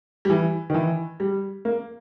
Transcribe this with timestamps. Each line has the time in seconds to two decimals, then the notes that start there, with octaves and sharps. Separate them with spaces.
0.25 G3
0.30 E3
0.70 D#3
0.74 E3
1.20 G3
1.65 A#3